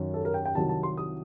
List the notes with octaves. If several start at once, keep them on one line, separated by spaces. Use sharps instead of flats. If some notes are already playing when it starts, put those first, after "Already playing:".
Already playing: F#2 D#3 F#3
A4
A#4
G5
G5
C2 C3 D#3 F#3 A5
A5
C6
D#6